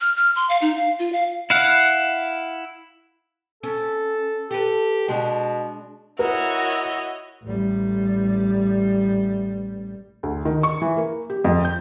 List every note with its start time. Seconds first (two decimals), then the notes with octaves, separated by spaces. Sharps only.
0.01 F6
0.17 F6
0.36 C6
0.49 F5
0.62 D#4
0.76 F5
0.99 F4
1.13 F5
1.50 E4 F5 F#5
3.63 C#4 A4
4.51 G4 A4 B4
5.08 B2 G#3 D4
6.19 E4 F#4 A#4 C#5 D#5
7.43 A1 G3
10.23 D2
10.45 D#3
10.63 C#6
10.82 E3
10.97 A#3
11.30 G4
11.44 F2
11.65 G6